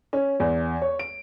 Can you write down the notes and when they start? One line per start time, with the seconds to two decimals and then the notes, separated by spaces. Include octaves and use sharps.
0.13 C#4
0.40 E2
0.82 C#5
0.99 D7